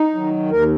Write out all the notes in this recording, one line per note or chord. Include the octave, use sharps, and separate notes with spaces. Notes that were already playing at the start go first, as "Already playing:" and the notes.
Already playing: D#4
D#3 F#3
D#2 A#4